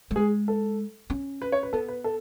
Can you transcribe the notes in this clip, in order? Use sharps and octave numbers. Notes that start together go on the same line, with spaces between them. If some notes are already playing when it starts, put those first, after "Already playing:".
A3
G#3 G#4
A4
C#4
B4
C#5
B4
B3 A4
B4
A4